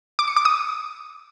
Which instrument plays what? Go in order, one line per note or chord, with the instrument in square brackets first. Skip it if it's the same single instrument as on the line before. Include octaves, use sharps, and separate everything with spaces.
[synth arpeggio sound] D6
C#7
D6
D#6